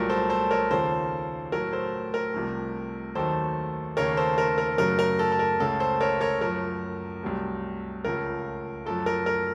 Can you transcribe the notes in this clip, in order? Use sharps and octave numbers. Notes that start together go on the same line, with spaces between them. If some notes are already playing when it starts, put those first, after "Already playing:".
Already playing: C2 A#2 F#3 A3 A#4
A4 C5
A4 C5
A#4 C#5
D#2 C#3 F3 A4 C5
A2 F#3 A3 A#4
A4 C5
A#4
C2 C3 F3 A3
D#2 D#3 F#3 A3 A4 C5
D#2 C#3 A3 A#4 C#5
A4 C5
A#4
A#4
F#2 C#3 F#3 A3 A#4
A#4
A4
A4
A#4
C#2 C#3 A3 A4
A4 C5
A#4 C#5
A#4 C#5
F#2 F3 A3 A#4
C2 C3 F#3 A3
C#2 C#3 F3 A3 A#4
F#2 F3 A3 A4
A#4
A#4